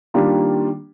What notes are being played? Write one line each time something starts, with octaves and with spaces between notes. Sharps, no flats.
D#3 G3 A#3 D4 F4